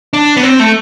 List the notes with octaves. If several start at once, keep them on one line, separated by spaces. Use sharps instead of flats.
D4
B3
C4
A3